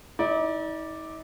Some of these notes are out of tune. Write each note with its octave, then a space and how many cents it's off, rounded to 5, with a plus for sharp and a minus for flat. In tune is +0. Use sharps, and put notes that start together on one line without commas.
D#4 +45 D5 +0